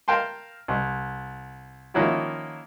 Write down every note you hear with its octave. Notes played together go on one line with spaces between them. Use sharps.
A#4 F5 G5 A5 C6
C2
D#3 F3 A#3 C#4 E4 F#4